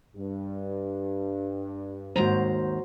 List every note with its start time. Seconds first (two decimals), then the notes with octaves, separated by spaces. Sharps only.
0.16 G2
2.16 D#2 G#2 F#4 C5 A#5